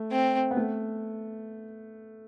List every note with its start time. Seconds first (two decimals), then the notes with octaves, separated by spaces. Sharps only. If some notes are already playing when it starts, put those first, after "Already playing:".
Already playing: A3
0.10 C4
0.51 B3
0.57 A3